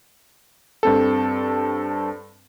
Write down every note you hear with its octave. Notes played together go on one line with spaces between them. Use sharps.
G2 C4 A4